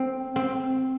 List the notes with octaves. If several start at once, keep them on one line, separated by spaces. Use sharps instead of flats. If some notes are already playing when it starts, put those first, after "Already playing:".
Already playing: C4
C4